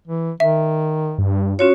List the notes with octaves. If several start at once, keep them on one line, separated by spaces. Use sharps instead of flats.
E3
D#3 E5
G2
C#4 F4 F#4 C#5